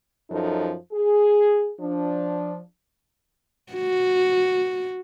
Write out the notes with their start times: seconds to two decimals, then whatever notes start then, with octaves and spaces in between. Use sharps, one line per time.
0.31 F#2 F3 D#4 A4
0.92 G#4
1.79 F3 D4
3.73 F#4